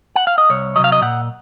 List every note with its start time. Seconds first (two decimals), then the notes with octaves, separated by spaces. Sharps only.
0.16 F#5
0.27 F5
0.38 D#5
0.50 C2 C#5
0.76 F#3 D#5
0.79 C3 F5
0.92 D#5
1.02 A#2 F#5